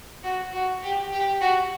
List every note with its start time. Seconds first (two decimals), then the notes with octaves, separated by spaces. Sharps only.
0.24 F#4
0.53 F#4
0.82 G4
1.12 G4
1.41 F#4